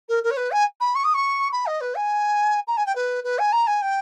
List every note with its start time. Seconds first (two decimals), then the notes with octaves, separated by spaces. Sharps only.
0.09 A#4
0.23 A#4
0.31 C#5
0.37 B4
0.51 G#5
0.80 B5
0.95 C#6
1.04 D#6
1.14 C#6
1.52 B5
1.66 D#5
1.81 B4
1.95 G#5
2.67 A#5
2.77 G#5
2.86 G5
2.95 B4
3.24 B4
3.39 G#5
3.52 A#5
3.67 G#5
3.82 G5